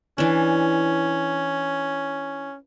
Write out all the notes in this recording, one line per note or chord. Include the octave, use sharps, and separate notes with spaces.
E3 C#4 D4